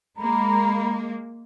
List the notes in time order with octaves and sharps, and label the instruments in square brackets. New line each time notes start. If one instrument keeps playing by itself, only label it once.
[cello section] G#3 A#3 [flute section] A#5 B5